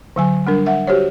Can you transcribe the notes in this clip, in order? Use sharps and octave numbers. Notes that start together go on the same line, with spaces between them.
D3 F#3 G#5
G3 D4 A#4
E5 F#5
F#4 G4 C5 C#5